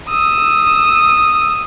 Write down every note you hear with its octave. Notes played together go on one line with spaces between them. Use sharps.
D#6 E6